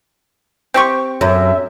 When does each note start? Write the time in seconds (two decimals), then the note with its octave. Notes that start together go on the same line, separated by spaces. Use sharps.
0.74 C4 G4 C#6
1.21 F#2 E5